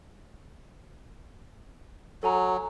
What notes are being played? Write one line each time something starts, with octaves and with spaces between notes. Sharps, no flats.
F#3 A4 G#5 A#5